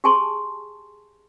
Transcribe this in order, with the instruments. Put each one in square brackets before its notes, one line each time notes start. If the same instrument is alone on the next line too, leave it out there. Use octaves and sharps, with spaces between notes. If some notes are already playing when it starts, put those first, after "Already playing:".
[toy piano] G4 G#4 G#5 A5 C6 C#6